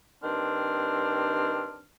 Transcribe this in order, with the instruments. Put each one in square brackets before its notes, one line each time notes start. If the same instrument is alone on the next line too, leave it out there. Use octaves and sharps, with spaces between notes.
[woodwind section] G2 D#3 C4 D4 F6